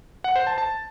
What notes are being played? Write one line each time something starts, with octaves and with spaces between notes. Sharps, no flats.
F#5
C5
A5
A5